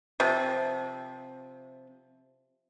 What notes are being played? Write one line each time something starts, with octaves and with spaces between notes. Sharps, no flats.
C3 F3